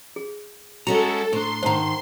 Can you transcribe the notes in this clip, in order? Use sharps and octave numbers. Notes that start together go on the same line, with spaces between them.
G#4
G#3 C#4 F#4 A4 C#5 A#5
A2 D4 C5 A#5 C6
G#2 D#3 C5 A5 A#5